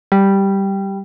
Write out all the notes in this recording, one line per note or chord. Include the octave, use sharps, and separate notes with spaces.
G3